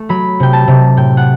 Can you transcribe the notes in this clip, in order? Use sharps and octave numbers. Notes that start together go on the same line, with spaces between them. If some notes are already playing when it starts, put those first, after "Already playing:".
Already playing: A3
F#3 B5
C3 G5
A5
C3
A2 G5
F#5